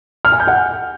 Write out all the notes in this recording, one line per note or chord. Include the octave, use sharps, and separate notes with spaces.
F6
G#5
G6
F#5